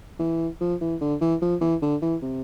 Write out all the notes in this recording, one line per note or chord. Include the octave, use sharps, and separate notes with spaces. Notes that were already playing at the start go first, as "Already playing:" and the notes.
E3
F3
E3
D3
E3
F3
E3
D3
E3
C3